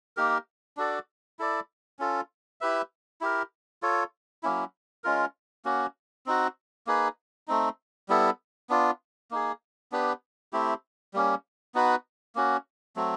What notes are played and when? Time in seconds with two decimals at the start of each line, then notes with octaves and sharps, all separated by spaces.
0.17 A#3 D#4 G4 A#4
0.77 D4 F#4 A4 D5
1.39 E4 A4 D5
1.99 C#4 F4 A4
2.61 E4 G4 B4 E5
3.21 E4 G4 A#4
3.82 F4 A4 C#5
4.43 F#3 A#3 C#4 E4
5.04 G#3 C#4 F4 A#4
5.65 A#3 C#4 F#4
6.26 C4 D#4 F#4
6.87 A#3 D#4 G#4 B4
7.48 A3 C4 D#4
8.09 G3 B3 E4 A4
8.69 B3 D4 F4
9.31 A#3 D#4 G#4
9.92 B3 D4 G4 B4
10.53 A3 C4 E4 G4
11.14 G3 A#3 C#4
11.74 B3 D#4 F#4 B4
12.35 A#3 C#4 F#4
12.96 F#3 A3 C4